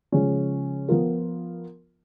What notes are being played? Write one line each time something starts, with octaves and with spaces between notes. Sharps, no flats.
C#3 F3 G#3 C#4
F3 B3 F4 A#4